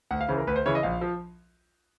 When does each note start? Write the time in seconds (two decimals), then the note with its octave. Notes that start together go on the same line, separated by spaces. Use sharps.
0.11 D2 F#5
0.21 F5
0.28 C#3 E3 C5
0.38 A#4
0.47 D2 B4
0.56 C5
0.66 C#3 E3 C#5
0.75 D#5
0.83 A#1 F5
1.01 F3